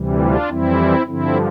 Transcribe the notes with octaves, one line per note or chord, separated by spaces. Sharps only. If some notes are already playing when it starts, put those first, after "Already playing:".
Already playing: D2 C3 E3 G3
D4 F4
F2 E3 G3 C4 E4
G2 D3 F3 C4 E4